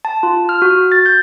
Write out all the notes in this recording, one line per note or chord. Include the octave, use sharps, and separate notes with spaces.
A5
F4
F6
F#4
A6
G6